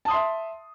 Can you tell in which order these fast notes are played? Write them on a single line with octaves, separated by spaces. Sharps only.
A5 D#6 C6 E5